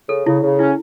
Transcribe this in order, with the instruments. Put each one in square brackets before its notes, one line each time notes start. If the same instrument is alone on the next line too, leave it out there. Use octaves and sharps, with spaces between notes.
[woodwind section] C#3 [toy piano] A4
[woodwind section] C#3 [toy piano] E4
[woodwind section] C#3
[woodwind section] C#4 [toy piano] E4